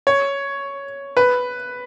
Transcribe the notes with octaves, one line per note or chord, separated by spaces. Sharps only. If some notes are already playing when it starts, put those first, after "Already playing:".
C#5
B4